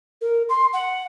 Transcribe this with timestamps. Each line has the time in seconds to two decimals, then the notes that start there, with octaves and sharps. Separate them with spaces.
0.21 A#4
0.49 C6
0.73 F#5